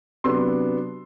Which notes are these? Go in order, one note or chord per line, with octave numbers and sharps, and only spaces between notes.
C3 F#3 B3 D4 C6 E6